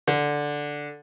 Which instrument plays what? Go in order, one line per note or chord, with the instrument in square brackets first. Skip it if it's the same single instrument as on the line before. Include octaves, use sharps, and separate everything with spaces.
[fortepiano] D3